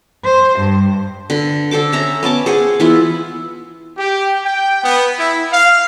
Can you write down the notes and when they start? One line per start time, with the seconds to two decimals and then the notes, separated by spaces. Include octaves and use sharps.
0.24 C5
0.59 G2
1.30 D3 B4
1.71 D3 A4 C5 D6
1.92 C#4 E5 A#5
2.23 B3 C#4 A5 D6
2.46 G#4 C5 F#5 G#5
2.80 E3 B3 E4 F4
3.97 G4
4.44 G5
4.83 B3
5.18 E4
5.51 F5